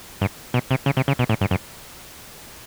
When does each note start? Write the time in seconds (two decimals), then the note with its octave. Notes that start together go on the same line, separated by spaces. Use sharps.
0.21 G2
0.54 B2
0.71 C3
0.86 C#3
0.97 C3
1.08 C#3
1.19 B2
1.29 A2
1.41 G2
1.51 F#2